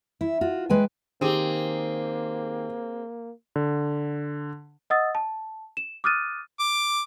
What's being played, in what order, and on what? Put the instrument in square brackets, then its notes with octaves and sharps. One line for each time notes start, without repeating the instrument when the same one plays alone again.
[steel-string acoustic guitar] E4
F4 F#4
G#3 B4 G5 G#5
[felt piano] D#3 G4 [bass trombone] A#3 [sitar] C4 G#4
[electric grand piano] D3
[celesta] D#5 F#5 D#6 E6 A6
A5
E7
D6 D#6 F6 F#6 A6 D#7
[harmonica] D6